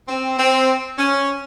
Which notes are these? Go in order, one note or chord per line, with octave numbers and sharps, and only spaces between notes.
C4
C4
C#4